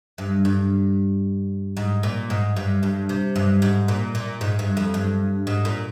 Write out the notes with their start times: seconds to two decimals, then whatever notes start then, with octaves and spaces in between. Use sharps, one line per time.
0.18 G2
0.45 G2
1.77 G#2
2.03 A#2
2.30 G#2
2.56 G2
2.83 G2
3.09 C3
3.36 G2
3.62 G#2
3.88 A#2
4.15 A#2
4.41 G#2
4.59 G2
4.77 F2
4.94 G2
5.47 G#2
5.65 A#2